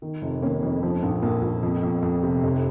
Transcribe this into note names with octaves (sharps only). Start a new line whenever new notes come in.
D#3
F1
D#3 A#3 C#4
F2
F3
A#1
A#1 A#3
A#1
F2
F2
F2
C3
F1